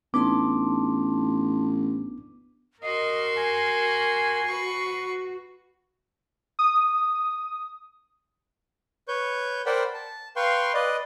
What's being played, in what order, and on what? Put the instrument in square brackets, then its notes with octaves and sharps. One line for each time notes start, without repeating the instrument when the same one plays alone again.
[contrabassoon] A1 [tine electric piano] B3 D4 [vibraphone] D#4 A5 C6 [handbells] D6
[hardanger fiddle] F#4 C6 [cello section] A#4 [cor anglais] D#5 [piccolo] C7
[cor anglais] G#5
[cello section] F#4 [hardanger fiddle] B4 C#6
[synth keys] D#6
[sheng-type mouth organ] B4 C#5 C#6 G6
A#4 C5 D5 F#5 G5 B5
A5
B4 F5 G5 C6 C#6
B4 D5 D#5